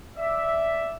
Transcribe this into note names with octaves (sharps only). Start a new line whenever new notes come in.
D5 E5